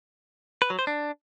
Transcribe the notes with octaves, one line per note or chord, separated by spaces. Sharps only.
B4
F#3
C5
D4